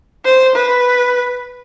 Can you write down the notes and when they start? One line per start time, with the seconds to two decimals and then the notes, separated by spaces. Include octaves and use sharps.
0.25 C5
0.55 B4